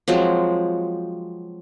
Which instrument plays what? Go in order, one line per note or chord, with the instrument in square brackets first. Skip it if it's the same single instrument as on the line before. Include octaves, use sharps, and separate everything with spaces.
[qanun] F3 F#3 G#3 C4